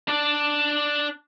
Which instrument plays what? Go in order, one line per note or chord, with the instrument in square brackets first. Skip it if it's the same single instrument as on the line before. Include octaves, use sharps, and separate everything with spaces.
[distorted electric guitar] D4 D5